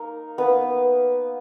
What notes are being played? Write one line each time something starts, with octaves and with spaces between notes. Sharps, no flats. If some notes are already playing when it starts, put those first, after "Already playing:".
Already playing: A#3 D#4 A#4
A#3 B3 D#4 B4